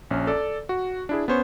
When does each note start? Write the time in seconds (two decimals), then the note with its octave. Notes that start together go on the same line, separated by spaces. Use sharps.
0.11 A#1 C#4
0.27 A4 D5
0.69 F#4
1.09 D4 E4 G#4
1.28 B3 C#4 C5 C#5